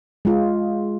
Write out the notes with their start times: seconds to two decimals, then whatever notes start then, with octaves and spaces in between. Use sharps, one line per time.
0.25 G#3 F4